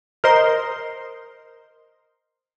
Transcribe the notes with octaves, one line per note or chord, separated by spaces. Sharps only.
A#4 C5 D#5 C6